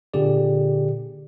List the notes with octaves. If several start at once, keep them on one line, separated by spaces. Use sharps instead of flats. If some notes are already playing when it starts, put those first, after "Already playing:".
A#2 D3 G4 G#4 D5